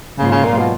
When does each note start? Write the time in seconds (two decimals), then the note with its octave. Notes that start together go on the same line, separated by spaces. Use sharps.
0.18 G#2 C#3 F#3 A#3 F4
0.31 C#3
0.45 A#2
0.58 B2